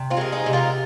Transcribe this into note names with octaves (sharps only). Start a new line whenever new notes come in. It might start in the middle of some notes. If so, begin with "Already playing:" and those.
Already playing: C3
C4 F4
G#3 A#4
D#4 G#4
C3
F4 A#4